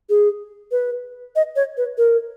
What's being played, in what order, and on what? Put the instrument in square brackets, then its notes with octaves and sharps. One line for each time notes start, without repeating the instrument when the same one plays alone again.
[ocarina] G#4
B4
D#5
C#5
B4
A#4